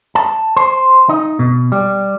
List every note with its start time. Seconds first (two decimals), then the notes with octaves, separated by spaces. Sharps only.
0.15 A5
0.57 C5
1.09 D#4
1.39 B2
1.72 G3